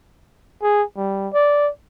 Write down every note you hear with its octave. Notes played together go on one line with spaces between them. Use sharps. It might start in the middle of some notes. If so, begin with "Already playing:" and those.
G#4
G3
D5